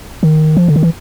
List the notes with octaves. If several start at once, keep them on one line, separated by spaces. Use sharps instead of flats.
D#3
F3
D3
D#3
E3